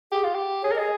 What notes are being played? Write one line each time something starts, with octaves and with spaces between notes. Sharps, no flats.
G4 G#4
F4
G4
G#4 C#5
A#4
G#4 D#5